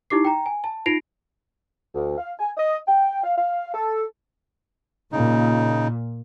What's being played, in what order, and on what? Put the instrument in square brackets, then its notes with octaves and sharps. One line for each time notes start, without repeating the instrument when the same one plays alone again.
[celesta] D#4 E4 G4 D6 C7
G5 A#5
G#5
A5
D#4 F4 A#6 C7 D7 F7
[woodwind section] D2
F5
G#5
D#5
G5
F5
F5
A4
[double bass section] A#2 [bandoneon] C#3 D#4